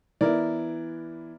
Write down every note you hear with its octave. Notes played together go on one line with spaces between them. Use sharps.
E3 B3 E4 A#4 D5